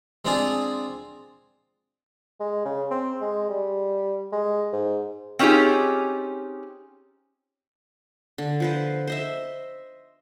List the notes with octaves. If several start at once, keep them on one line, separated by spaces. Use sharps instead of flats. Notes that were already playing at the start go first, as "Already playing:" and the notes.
G#3 C4 D4 F4 G#4
G#3
C#3
C4
G#3
G3
G#3
G#2
C4 C#4 D#4 F4 G4 G#4
D3
F3 B4 C5
C5 D#5 E5